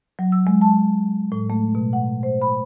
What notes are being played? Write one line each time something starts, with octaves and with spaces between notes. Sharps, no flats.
F#3
E6
G#3
A5
A2
A3
B2
F#5
C5
B5